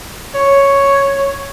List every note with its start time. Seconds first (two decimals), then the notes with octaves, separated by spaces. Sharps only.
0.34 C#5